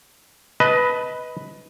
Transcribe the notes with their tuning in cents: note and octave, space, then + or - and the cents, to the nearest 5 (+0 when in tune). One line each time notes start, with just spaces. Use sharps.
B4 +0 D#5 +20 A5 +0